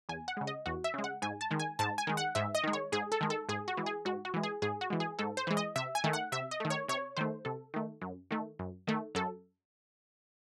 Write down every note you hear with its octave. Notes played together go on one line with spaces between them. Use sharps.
E2 G#5
F#5
C#3 G#3
D#5
E2 F#4
E5
C#3 G#3
F#5
G#2 G#5
A5
D#3 G#3
G#5
G#2 A5
G#5
D#3 G#3
F#5
G#2 E5
D#5
D#3 G#3
C#5
G#2 G#4
A4
D#3 G#3
A4
G#2 G#4
F#4
E3 G#3
G#4
G#2 F#4
F#4
E3 G#3
G#4
G#2 G#4
F#4
E3 G#3
G#4
G#2 A4
C5
E3 G#3
D#5
C3 E5
G#5
D#3 A3
F#5
C3 E5
D#5
D#3 A3
C#5
C3 C#5
D#3 A3 C5
C3 A4
D#3 A3
F#2
D#3 A3
F#2
D#3 A3
F#2 A4